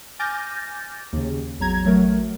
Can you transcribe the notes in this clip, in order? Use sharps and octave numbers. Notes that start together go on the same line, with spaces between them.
G#5 D6 F6 G6 A6 A#6
D#2 C#3
A1 E2 F#3 A#5 G#6
A1 F#3 A3 A#4